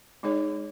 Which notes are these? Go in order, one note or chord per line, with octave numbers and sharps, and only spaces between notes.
G#3 D#4 G#4 C#5